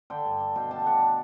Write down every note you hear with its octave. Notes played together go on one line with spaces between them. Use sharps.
D3 G5
G2
D4
B2 G5
D4 A5
G5
D4 F#5
D4